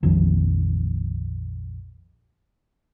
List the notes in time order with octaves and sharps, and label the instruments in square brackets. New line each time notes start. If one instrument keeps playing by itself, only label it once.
[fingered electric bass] A#1 F2 D#3 F3